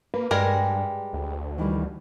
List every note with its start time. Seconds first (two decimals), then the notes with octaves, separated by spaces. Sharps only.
0.14 A#3 B4
0.31 G2 G3 G#3 A#4
1.13 D2
1.58 D#3 E3 G3